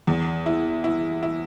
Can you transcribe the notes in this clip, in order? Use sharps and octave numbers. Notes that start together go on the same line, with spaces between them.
E2
E4
E4
E4